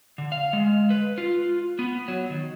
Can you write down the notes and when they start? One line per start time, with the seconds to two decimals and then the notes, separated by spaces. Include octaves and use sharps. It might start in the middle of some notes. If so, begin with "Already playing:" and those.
0.18 D3
0.32 F5
0.53 G#3
0.90 B4
1.18 F4
1.79 B3
2.08 F#3
2.30 D#3